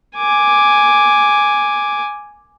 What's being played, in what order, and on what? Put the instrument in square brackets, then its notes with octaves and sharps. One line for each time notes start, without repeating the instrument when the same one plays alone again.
[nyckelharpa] G#5 D6